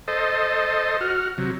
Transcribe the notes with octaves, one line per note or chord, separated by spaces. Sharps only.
A4 C5 D#5
F#4 F6
C3 F#3